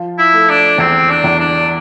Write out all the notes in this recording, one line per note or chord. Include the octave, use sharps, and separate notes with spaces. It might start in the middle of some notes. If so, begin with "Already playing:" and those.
Already playing: F3 F4
E4
A3
D4
E2 C4
D4
E2
D4